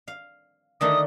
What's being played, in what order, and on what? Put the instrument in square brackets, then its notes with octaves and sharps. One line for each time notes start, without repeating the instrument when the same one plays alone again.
[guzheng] F5
[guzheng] D3 D#3 A3 [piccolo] D#6